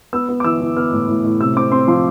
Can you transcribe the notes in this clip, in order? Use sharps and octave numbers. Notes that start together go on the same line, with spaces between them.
B3 E6
B3
D6
E3 E6
E3
B3 F6
A2
A2
A2
C3 E6
C4 D6
C4 C6
F3 C6